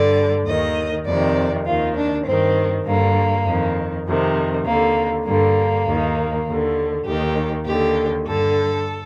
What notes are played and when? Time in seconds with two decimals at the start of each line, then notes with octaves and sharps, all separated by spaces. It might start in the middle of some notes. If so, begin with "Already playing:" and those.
Already playing: G2 D3 D5
0.46 D#2 D#3 D#5
1.06 F2 C3 D#3 D5
1.66 D#2 D#3 F4
1.95 D4
2.26 G2 D#3 C4
2.85 G2 D3 A#3
3.46 F2 D#3
4.06 F2 C3 D#3
4.65 D#2 D3 A#3
5.25 G2 D3 A#3
5.86 D#2 D#3
6.46 D#2 D3
7.06 D#2 D#3 G4
7.65 D#2 D3 G4
8.25 G2 D3 A4